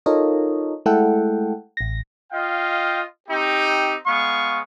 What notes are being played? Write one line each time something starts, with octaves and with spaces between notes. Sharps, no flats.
D#4 F4 A4 A#4 C#5 D#5
G#3 A3 E4 A4 F#5 G5
A1 A#6
F4 D#5 F5 G5
C4 D#4 G4
G#3 B3 F5 C#6